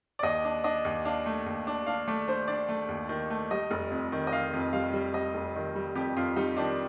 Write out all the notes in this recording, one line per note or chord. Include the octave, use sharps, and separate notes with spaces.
D5
D#2 D#5
D4
D4 D#5
D#2
D4 F5
A3
D#2
D4
D4 F5
A3 D5
D4 C5
D4 D5
A3
D#2
D#3
A3
G3 D#5
F1
F2
D#3
D#5
D#3 F5
F2
G3 F5
G3
G3 D#5
F1
D#3
G3
F2 G4
F2 F4
G3 D#4
D#3 D4